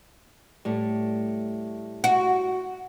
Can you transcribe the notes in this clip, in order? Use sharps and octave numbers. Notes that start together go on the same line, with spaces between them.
A2 G3 A3
F#4